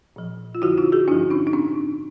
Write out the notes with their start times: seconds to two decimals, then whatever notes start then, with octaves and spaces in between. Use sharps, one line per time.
0.16 A#2 F3
0.55 F4
0.62 F2 D3 F3 E4 F#4
0.77 D#4 F4
0.92 F#4 G#4
1.08 G2 D3 F3 D4 E4
1.31 C#4 D#4
1.47 D#4
1.53 A2 C4 D4